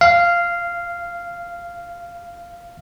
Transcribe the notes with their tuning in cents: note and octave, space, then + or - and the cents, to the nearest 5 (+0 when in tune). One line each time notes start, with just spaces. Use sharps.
F5 -10